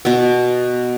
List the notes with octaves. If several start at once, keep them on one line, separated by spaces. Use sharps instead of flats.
B2 B3